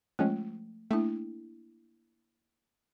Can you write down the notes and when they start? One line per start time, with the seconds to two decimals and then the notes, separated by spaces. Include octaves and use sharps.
0.19 F3 G#3 A3 C#4
0.91 A3 A#3 D4 E4